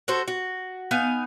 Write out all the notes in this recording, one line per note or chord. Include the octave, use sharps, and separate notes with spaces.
F#4 A4 C5
F#4
B3 D#4 F5 G#5